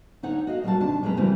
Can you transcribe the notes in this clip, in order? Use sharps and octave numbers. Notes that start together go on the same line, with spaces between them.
D2 D#4 C#5 F#5
F#4 D#5 F5
F#3 G3 A#3 F#4 F#5 A5
D#2 C3 D4 A5
F#2 B2 G#3 C#4 B4 A#5
C#3 E3 F#3 G3 A#3 C4